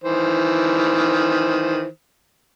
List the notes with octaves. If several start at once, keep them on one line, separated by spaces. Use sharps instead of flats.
D#3 E3 C5